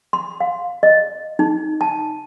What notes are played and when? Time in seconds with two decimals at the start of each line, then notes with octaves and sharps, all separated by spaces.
0.13 C6
0.40 F5
0.83 D#5
1.39 D#4
1.81 A5